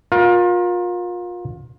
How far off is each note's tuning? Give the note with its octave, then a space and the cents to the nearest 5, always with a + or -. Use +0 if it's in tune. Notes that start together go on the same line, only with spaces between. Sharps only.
F4 +30 A#4 +30